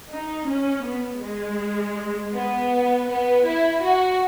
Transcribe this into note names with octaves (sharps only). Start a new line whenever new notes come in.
D#4
C#4
B3
G#3
B3
B3
E4
F#4